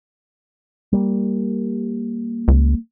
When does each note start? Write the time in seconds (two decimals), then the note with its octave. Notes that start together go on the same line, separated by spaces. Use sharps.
0.93 G3 A#3
2.48 C#2